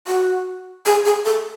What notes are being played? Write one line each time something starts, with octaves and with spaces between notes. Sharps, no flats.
F#4
G#4
G#4
A4